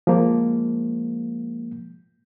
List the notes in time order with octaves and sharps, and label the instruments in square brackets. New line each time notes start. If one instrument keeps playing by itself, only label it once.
[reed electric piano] F3 G#3 A#3